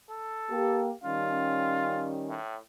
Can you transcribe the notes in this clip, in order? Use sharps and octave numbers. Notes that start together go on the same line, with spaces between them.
A4
A#3 G4
D#3 G3 C#4 F4
A2